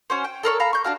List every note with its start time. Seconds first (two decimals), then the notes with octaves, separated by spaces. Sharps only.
0.10 C#4 F#4 C5
0.24 G5
0.43 A4 A#4 C5 C#5
0.60 A4 F5 A#5 B5
0.73 C#6 G6
0.84 D4 F#4 F5